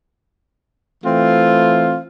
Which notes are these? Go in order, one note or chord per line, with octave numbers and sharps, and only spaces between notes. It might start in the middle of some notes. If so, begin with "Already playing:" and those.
E3 A3 C4 F4